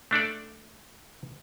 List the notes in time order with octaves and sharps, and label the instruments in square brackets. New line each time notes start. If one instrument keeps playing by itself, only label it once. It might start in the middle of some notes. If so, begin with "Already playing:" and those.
[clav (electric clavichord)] A3 D4 A4 D5